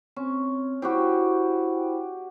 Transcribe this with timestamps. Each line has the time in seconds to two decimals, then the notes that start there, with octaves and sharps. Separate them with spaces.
0.17 C4 C#4
0.82 E4 F#4 G4 C5 G5 B5